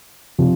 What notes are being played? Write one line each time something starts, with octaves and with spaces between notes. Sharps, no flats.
C3 F3